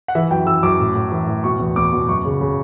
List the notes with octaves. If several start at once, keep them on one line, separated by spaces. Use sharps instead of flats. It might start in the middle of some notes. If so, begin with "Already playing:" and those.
F#5
E3 E5
F#2 G5
E3 E6
F#2 D6
A2
A2
E3
A2
B2 C#6
E2
E2 D6
B2
F#2 C#6
C#3
C#3